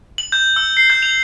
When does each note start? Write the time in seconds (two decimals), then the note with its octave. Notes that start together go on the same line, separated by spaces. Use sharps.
0.18 F#7
0.32 G6
0.56 E6
0.77 C7
0.90 G6
1.02 F7